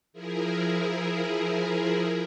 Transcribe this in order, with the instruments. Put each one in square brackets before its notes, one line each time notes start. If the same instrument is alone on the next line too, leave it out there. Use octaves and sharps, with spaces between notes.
[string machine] F3 E4 G#4 A#4